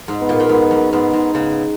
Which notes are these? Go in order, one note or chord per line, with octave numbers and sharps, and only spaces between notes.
G#2
B3
A#2
A#2
G#2 B3
F#2
G#2 B3
G#2
C#3 B3